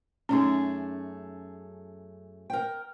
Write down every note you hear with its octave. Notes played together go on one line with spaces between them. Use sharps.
F#2 A3 C#4 D#4 G#4
A#4 G5